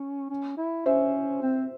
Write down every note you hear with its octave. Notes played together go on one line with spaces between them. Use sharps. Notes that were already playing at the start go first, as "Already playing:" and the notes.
Already playing: C#4
C#4
E4
C#4 C5 E5
C4